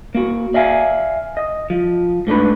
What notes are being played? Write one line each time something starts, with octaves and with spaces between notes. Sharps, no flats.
A#3 F#4
D5 E5 F5 G#5
D#5
F3
G#2 A3 D4 B4